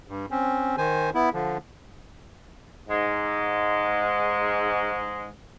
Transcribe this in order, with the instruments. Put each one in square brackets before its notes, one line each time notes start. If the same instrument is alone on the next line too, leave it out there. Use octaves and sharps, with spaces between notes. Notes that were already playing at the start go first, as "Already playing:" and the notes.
[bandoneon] G2
C4 C#4
D#3 C5 G#5
B3 E4
D3 F3
[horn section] G#2 G#3